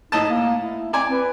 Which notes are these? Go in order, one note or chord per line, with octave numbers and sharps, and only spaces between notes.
A2 D#4 D#5 A5
A#3
E4
C4 D5 G#5
B4